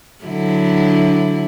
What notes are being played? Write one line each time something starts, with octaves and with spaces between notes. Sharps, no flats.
D3 F#3 E4